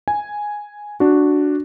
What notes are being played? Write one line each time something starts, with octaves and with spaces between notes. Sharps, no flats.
G#5
D4 F#4